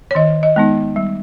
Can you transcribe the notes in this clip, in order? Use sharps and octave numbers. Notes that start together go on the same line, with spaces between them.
C#5
D#3 D#5
D#5
G#3 B3 D#4
G3